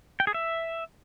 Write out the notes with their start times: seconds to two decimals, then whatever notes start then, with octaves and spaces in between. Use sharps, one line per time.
0.20 G5
0.27 G#4
0.34 E5